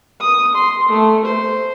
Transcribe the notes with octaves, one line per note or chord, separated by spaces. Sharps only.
D#6
C6
A3
C5